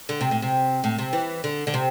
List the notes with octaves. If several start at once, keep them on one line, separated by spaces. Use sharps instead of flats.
D3
C3
A2
C3
A2
C3
E3
D3
D3
C3